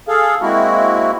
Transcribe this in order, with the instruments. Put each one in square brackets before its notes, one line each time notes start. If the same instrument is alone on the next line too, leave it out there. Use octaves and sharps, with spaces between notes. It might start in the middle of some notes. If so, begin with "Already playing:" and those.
[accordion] G#4 A4 F5
G#3 A#3 C4 E4 F#4